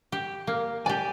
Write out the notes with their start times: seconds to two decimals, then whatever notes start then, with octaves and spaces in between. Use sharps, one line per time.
0.12 G4
0.47 A#3
0.86 G4 D5 G#5